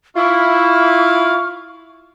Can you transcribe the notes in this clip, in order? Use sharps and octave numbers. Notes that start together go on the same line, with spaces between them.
E4 F4 C#6 F6